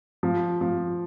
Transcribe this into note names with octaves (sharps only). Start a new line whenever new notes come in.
F3
F3